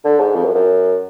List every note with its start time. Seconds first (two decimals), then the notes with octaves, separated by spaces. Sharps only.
0.04 D3
0.20 G#2
0.35 F2
0.45 F#2
0.55 F#2